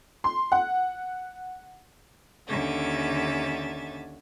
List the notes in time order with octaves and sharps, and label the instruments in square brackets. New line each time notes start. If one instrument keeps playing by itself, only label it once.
[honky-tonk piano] C6
F#5
[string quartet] D#2 D3 C#4 E5 A6